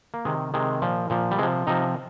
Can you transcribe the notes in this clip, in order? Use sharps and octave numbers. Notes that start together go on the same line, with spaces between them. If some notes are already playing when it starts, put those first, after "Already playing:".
A#3
C3 D#3 G#3
C3 D#3 G#3
A#2 F3
A#2 F3
G3
C3 F3 G#3
C3 F3 D#4